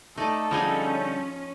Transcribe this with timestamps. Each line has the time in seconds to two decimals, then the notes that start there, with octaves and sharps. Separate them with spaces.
0.18 A3 D#4 A4 D5 D#5
0.51 D3 F3 G3 C#4 D#4 G#4 G#5